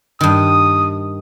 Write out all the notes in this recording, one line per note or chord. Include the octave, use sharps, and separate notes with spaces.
G2 D#3 D#6